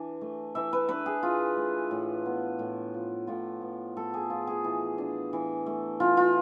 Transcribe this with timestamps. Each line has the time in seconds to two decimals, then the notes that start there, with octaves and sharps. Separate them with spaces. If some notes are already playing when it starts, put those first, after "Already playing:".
Already playing: E3 D4
0.21 A3
0.55 E3 E5
0.73 B4
0.89 D4 B4
1.06 G#4
1.23 E3 F4
1.57 A3
1.91 A2
2.26 B3
2.59 A2
2.94 F3
3.27 A2 F4
3.62 B3
3.97 A2 A4
4.14 G#4
4.30 F3 F4
4.47 G#4
4.64 E3
4.98 D4
5.33 E3
5.66 A3
6.00 E3 F4
6.17 F4